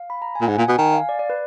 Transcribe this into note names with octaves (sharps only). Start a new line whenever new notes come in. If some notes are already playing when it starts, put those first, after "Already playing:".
Already playing: F5
B5
A#5
G#5
A#2
G#2 F#5
A#2
B2 G#5
D#3 G#5
F5
D5
D5
B4